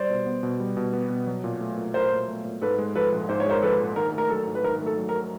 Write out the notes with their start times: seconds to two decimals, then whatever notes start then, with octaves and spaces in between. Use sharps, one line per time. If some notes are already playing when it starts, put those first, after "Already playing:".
Already playing: G3 C5 D5
0.10 B2
0.26 B3
0.43 B2
0.60 G3
0.77 B2
0.93 B3
1.10 B2
1.27 F#3
1.44 A#2
1.61 A3
1.77 A#2
1.94 F#3 A#4 C5
2.12 A#2
2.28 A3
2.45 A#2
2.61 G#2 A4 B4
2.78 G#3
2.95 F3 A4 B4
3.12 A#1
3.29 G#2 C5
3.40 C#5
3.46 G#3 A#4 C5
3.62 F3 A4 B4
3.80 A#1
3.96 D#3 A#4
4.13 A3 A#4
4.30 F#3 A4
4.47 G#2
4.55 B4
4.64 D#3 A#4
4.80 A3
4.86 A4
4.97 F#3
5.09 A#4